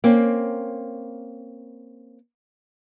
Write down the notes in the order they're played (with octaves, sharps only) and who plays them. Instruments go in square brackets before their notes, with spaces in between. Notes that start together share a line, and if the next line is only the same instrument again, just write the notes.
[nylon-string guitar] A#3 C4 C#4